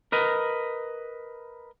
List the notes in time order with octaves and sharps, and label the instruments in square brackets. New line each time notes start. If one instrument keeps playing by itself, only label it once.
[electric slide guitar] A#4 B4 D#5